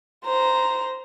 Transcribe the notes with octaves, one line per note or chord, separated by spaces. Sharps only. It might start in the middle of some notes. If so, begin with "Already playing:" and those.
C5 A#5